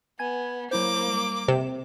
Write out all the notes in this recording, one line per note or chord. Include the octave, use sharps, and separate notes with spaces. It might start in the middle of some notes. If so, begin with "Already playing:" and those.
B3 G#5 G#6
F#3 A#3 E4 C5 D6
G3
C3 E7